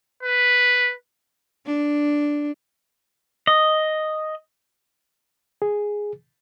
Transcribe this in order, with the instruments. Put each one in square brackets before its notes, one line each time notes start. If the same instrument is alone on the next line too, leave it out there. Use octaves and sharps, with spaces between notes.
[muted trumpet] B4
[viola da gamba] D4
[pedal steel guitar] D#5
[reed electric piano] G#4